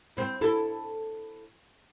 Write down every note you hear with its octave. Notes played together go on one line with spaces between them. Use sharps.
C4 E4
E4 A4